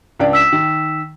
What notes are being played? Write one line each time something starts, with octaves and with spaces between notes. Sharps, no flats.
C#2 D4 D5
E6 B6 E7
D#3